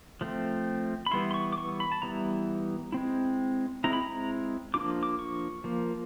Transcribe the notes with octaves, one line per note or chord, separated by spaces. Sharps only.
F3 A3 C4
B5
E3 G3 B3 E4 C6
C6
C#6
D6
C#6
B5
A5
E3 G3 B3 E4 A#5
G#3 C4 E4
G#3 C4 E4 A#5
B5
A#5
F3 A#3 D4 F4 D6
D6
C#6
F3 A#3